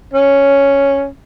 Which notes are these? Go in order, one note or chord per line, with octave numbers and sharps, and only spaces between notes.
C#4